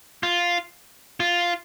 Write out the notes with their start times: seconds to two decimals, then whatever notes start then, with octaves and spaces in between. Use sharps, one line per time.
0.23 F4
1.20 F4